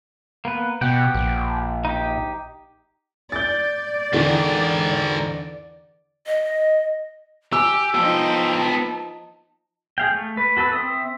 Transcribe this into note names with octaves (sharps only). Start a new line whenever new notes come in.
A#3 B3 B4
B2 G4 F#5 G5
A#1
D#4 G4
D5 G6 A6
E2 G#2 D3 D#3
D#5
G4 G#5 E6
F3 B3 D#4 G5 A5
G#4 F5 G5
A3
B4
F#4 A4 B4 E6
C4 E5 D#6